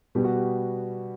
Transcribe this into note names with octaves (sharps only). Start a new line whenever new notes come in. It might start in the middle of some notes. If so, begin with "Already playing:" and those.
B2 G3 B3 G4
F#4
G4